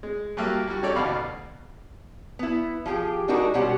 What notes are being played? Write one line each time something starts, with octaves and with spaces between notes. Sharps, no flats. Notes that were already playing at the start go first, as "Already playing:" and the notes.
G#3
F#3 G3 A3 A#3 E5
G3 F#4
C#4 D#4 G4 A4 C#5 D5
A1 D2 B2 D5 F5 B5
B3 E4
F3 G4 G#4 G5
G#3 D4 D#4 F#4 G4 A#4
B2 G3 C#4 G4 C5 F#5